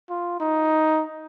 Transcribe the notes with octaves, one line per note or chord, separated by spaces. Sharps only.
F4
D#4